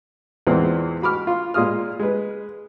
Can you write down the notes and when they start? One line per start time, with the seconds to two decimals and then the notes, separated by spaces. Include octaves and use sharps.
0.47 E2 A#2 E3 G#3 C4
1.02 F#4 B5 D6 F6
1.27 F4
1.54 A#2 G#3 F4 D#6 F6
1.99 G#3 B4